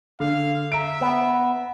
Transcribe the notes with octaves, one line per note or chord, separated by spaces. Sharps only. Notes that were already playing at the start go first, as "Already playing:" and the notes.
D3 F5
E5 A#5 D7
B3